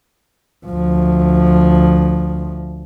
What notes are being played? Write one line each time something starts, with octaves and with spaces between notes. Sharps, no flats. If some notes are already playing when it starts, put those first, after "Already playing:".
D2 F3